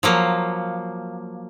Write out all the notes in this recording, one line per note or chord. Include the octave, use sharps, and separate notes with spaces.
F3 F#3 A#3